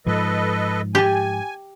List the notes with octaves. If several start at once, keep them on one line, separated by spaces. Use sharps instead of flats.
G#2 F3 A4 B4 D#5
G4 G#5 A5